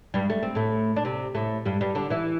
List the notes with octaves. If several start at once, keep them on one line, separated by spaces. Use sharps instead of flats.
G2 G3
A3
C4
A2 A3
D4
C3 C4
A2 A3
G2 G3
G2 G3
D3 D4
E3 E4